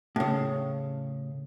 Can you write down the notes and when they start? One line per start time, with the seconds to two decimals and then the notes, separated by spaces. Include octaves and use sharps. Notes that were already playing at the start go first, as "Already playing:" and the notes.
0.16 A2 C#3